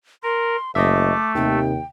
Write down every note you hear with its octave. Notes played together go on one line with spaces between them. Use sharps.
A#4 C6
F#1 A3 D#5 E5 D6
D#2 C3 D#3 G5